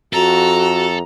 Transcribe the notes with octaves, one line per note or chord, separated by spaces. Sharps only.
F2 F#4 A4 A#5